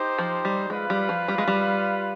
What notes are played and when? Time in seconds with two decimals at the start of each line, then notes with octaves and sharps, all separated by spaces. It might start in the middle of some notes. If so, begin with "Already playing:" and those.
Already playing: D#4 G4 C5
0.18 F3
0.45 G3
0.70 G#3 F4 B4 F5
0.90 G3
1.09 F3
1.28 G3
1.38 G#3
1.48 G3